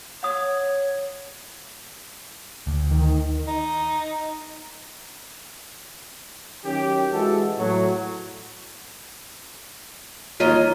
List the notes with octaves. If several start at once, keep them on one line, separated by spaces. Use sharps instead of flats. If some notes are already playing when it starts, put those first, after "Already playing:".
C#5 F#5 D#6
D2
D#3
D#4
D#3 F#3 C#4 G4
E3 G#3 F#4 A4
A2 F#3
D#2 E3 F4 C#5 D#5 A#5